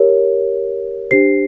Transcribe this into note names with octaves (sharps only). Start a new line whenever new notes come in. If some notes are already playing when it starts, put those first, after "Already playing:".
Already playing: G4 A#4 C#5
D4 G4 C5 C7